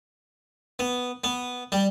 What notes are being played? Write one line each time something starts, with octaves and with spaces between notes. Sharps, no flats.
B3
B3
G3